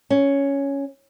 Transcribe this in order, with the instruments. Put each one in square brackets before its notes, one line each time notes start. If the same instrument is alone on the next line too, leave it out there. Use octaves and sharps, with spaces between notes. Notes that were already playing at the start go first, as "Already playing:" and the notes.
[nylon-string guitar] C#4